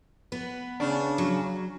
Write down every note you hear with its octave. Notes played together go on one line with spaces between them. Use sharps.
B3 B4
C#3 D4
F#3